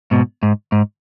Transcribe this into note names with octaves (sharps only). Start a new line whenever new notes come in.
G#2 B2
G#2
G#2